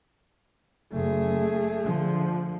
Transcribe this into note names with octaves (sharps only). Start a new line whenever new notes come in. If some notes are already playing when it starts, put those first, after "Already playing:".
F#1 A3 G#4
D3 F3